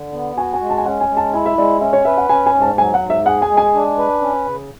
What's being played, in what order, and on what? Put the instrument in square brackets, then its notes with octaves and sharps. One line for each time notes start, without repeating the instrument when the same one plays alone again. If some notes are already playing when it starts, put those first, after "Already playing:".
Already playing: [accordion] D3
B3
[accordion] F#4 [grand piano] G#5
[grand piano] G#5
[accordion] G#3
[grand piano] A5
G#5
[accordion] C#4 [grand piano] F#5
[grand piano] G#5
[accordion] G#3
[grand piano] A5
[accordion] E4 [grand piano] G#5
[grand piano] E5
[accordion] G#3 [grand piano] D5
[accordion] C#4 [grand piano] E5
[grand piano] C#5
[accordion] B4 [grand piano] E5
[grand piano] F#5
[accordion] C#4 [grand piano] G#5
[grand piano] G#5
[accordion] G#2
[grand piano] A5
[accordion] F#3 [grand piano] G#5
[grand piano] F#5
[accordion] G#2
[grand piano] E5
[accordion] G#4 [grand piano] F#5
[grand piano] G#5
[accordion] G#3
[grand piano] G#5
[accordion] D4
B4
C#4
C#3